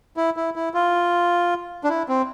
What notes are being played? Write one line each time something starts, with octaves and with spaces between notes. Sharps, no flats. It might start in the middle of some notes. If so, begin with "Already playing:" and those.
E4
E4
E4
F4
D4
E4
C4